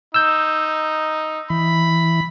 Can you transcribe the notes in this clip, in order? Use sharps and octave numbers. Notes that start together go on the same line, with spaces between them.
D#4 E6 G6
E3 B5